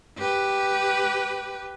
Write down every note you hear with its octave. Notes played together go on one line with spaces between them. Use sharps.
G4 B4